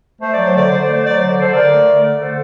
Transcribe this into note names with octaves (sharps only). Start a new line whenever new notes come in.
A3 C5
F#3 D5
C5
D3 D5
D3 C5
D5
A3 C5
F#3 D5
D3 C5
D5
D3 A4 C5
D3 A#4 D5
A3
D3
A3
D3 A4 C5